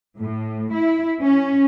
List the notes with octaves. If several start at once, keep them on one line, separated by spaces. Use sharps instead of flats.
A2
E4
C#4